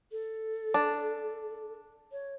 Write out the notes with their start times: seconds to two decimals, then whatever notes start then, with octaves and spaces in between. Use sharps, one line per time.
0.12 A4
0.74 D4
2.12 C#5